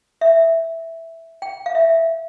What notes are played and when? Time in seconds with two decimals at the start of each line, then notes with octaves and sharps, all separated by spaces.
0.21 E5
1.42 G5
1.66 F5
1.75 E5